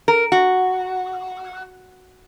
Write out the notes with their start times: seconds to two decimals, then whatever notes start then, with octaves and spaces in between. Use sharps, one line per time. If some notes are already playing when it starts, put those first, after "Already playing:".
0.08 A#4
0.32 F#4